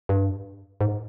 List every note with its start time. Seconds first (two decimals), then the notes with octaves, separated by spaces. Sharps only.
0.09 G2
0.81 G#2